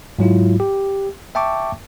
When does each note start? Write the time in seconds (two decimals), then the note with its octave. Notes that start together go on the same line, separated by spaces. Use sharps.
0.19 G#2 F#3 E4 F4
0.60 G4
1.35 E5 G5 A5 C#6 D6